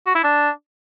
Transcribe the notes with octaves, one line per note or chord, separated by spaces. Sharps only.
F#4
E4
D4